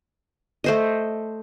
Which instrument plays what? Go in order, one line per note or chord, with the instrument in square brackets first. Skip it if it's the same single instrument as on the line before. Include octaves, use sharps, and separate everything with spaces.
[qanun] A3 C5 D#5